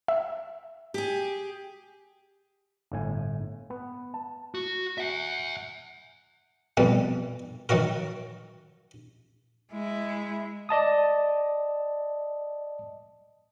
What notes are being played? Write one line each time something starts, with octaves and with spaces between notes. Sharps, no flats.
E5
G4 G#4
G1 A2 G#5
B3
A5
F#4
E5 F#5
F2 B2 G3
D#3 F#3 F#4 A#4
G#3 E4
D5 D#5 A5 D#6